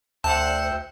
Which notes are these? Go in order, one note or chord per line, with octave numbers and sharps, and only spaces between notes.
D2 C5 E5 F#5 G5 A5